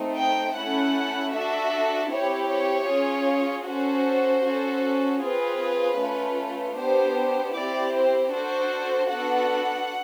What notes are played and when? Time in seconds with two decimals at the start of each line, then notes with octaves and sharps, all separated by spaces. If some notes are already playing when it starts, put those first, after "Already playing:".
Already playing: A3 C4 D#4
0.17 G5
0.56 A3 C#4 E4 A4 F#5
1.33 D4 F#4 A4 E5
2.11 C4 E4 G4 C#5
2.50 C#5
2.89 C#4 F4 G#4
3.66 C#4 F#4 A4 C5
4.44 C#4 F#4 A4
5.21 C4 F4 G#4 B4
5.99 A3 C#4 F4
6.76 B3 D4 G4 C5
7.54 C4 E4 G4 D5
7.93 C5
8.32 D4 F#4 A4 C5
9.09 B3 D4 F#4 A4 F#5